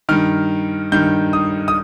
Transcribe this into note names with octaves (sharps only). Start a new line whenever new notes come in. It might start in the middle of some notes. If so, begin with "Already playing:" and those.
G2 D#3 F6
G2 D#3 G6
D#6
D#6